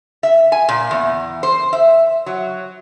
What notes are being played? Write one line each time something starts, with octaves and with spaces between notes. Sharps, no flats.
E5
G#5
A#2
E2
C5
E5
F#3